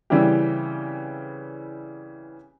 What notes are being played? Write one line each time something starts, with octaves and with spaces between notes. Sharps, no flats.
C#3 E3 G3 C4 E4 G4